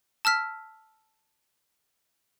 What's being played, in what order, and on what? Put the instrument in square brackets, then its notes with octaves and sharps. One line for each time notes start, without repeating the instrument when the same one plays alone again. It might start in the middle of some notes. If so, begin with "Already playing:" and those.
[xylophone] A5 E6 F6 B6